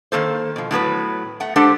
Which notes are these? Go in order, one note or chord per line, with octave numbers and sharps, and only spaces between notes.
D#3 A#3 A4 C5
B2 F3
A2 F#3 B3 B4
A3 F#5
G#3 D4 G4 A4 C5 F#5